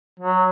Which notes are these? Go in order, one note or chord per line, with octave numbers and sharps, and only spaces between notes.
F#3